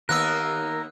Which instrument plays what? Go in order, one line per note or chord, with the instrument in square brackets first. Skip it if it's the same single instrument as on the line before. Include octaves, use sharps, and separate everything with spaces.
[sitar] D#2 A#3 B3 [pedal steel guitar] A#4 [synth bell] E6 F#6